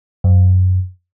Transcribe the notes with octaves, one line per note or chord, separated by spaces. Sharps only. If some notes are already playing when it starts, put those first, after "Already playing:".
F#2